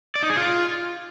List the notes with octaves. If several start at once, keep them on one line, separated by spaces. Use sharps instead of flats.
D5
D#4
G#4
F4